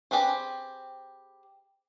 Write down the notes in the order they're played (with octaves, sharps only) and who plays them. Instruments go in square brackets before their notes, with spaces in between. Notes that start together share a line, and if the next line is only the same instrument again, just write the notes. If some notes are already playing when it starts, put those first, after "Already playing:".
[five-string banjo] C4 G4 G#4 B4 C5